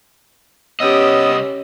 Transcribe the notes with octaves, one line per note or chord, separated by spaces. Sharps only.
C2 B3 C#4 G4 D#5 D#6 E6